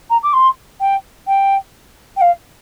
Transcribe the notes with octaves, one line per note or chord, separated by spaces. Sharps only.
A#5
D6
C6
G5
G5
G5
F5